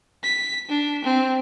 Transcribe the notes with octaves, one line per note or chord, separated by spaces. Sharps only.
B6
D4
C4